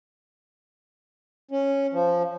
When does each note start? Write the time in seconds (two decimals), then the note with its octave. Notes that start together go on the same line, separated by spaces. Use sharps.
1.51 C#4
1.93 F3